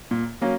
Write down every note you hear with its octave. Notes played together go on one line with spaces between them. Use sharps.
A#2
F#3 A#3 C#4